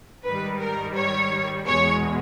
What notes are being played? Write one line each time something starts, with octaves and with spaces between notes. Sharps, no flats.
G#2 D#3 G3 B4
A#4
C#5
E2 B2 G#3 C#5